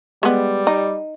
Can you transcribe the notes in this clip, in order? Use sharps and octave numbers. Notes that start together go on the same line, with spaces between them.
G3 G#3 B3
D#4